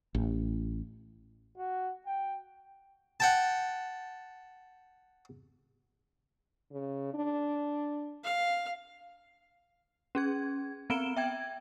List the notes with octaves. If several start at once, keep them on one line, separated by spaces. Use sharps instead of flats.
A1
F#4
G5
F#5 G5 A5
C#3
D4
F5
C#4 G#4 G#6
B3 C4 D7 E7 G7
E5 G5 G#6